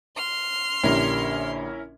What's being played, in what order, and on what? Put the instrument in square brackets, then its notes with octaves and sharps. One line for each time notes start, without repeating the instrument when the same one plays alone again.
[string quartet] C6 F6
[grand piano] A#1 D3 G4 [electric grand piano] C#4 E4 A#4